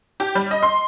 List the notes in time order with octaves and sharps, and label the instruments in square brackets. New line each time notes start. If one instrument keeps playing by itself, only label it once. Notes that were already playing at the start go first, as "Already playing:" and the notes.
[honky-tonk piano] G4
G3
D#5
C6